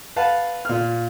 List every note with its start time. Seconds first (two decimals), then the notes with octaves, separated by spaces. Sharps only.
0.16 B4 F5 F#5 A5
0.65 A#2 F6